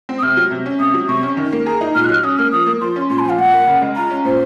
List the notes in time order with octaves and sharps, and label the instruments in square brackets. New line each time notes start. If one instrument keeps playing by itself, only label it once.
[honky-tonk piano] C4
[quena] D#6
[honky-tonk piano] C3 [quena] F6
[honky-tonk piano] F#3
C3
C#4
[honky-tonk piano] C3 [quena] D#6
[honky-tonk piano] F#3
[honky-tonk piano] C3 [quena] C#6
[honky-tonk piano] C#4
D#3
A#3
[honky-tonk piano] G#4 [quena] A#5
[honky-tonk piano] D#4
[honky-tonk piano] A#2 [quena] F6
[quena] F#6
[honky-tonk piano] F#3
[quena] F6
[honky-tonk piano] C#4 [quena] D#6
[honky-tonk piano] A#3 [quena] F6
[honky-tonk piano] F3 [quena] D#6
[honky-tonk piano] A#3
[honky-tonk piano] F3 [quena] C6
[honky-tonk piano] C#4
[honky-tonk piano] A#2 [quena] C6
[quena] G#5
[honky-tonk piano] F3 [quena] F5
[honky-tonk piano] A#2 [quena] F#5
[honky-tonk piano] A#3
C#3
G#3
[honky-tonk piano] F4 [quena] A#5
[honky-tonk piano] C#4
[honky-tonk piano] A#2 [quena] C5